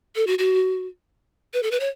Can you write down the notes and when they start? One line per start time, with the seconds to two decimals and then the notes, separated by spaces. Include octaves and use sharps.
0.16 A4
0.27 F#4
0.39 F#4
1.54 B4
1.63 A4
1.71 B4
1.80 C#5